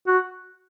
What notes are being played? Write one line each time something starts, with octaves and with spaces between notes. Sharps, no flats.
F#4